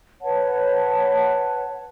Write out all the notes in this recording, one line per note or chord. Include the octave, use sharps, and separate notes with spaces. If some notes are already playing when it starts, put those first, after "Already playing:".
B4 C#5 F#5 A5